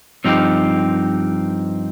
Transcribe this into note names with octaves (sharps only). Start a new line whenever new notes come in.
G2 F3 C4 D#4 G4